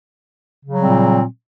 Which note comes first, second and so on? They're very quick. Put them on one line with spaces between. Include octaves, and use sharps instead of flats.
C#3 F#3 G3 C4 A#2